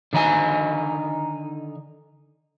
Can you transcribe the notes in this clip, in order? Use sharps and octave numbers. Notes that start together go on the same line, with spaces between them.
D3 D#3 D#4 D5 G#5